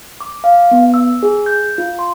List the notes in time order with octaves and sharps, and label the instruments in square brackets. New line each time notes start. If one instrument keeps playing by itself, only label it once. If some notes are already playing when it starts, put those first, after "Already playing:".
[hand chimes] D6
F5
B3
E6
G#4
G6
F4
C6